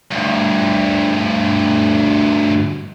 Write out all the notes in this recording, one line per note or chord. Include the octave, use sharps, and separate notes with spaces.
D2 G2